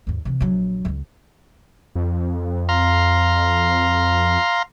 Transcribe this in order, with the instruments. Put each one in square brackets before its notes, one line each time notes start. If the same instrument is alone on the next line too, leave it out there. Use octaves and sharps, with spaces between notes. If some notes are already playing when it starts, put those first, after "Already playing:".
[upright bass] D#2 G#2
C3 E3
A#1 F#3
D1 C#2
[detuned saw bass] F2
[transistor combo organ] F5 A#5 C6